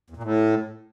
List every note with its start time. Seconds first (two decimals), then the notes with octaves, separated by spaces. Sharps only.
0.10 E2
0.17 A#2
0.23 A2